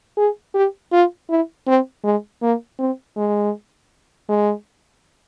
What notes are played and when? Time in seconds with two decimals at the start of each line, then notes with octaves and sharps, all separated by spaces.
0.17 G#4
0.54 G4
0.92 F4
1.29 E4
1.67 C4
2.04 G#3
2.42 A#3
2.79 C4
3.16 G#3
4.29 G#3